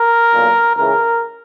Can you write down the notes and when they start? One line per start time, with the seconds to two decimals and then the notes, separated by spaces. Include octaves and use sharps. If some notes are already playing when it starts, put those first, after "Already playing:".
Already playing: A#4
0.32 B1 A#2
0.76 C#2 C#3 E3 A#4